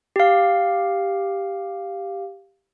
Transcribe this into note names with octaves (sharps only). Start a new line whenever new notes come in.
G4 F5